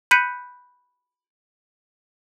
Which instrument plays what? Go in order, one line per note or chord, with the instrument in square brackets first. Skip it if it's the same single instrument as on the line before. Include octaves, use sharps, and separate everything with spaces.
[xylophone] B5 F#6 G6 B6 C#7 D#7